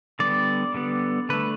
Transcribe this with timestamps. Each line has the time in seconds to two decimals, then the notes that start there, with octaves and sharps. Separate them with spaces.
0.19 D3 G3 B3 D5
0.74 D3 G3 B3
1.29 D3 A3 B4